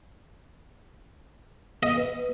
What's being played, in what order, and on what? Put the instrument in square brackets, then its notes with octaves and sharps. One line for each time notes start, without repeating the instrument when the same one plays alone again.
[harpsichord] D#5
[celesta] B4